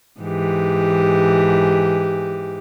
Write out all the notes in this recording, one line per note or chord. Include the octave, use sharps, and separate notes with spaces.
G#2 E3 G4